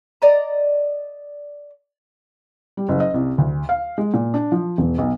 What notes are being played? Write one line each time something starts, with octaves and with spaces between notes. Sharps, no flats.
D5 D#5 A#5
G3
F#1
D#5
C2
D2
F5
G#3
A#2
D4
F3
E1
B1